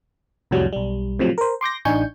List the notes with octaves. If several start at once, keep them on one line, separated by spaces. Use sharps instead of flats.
C2 F2 A2 F#3 G3
B1 G3
A2 C3 F3 F#3
A#4 C5
C6 D6 G6 A#6
A1 D4 D#4 G#5 C#6 G6